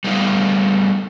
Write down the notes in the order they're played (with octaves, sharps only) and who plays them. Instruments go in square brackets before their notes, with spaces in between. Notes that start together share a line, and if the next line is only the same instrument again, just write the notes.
[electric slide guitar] G3 A3 B3 D#4 A#4 F5